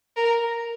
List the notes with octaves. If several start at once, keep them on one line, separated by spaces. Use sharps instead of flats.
A#4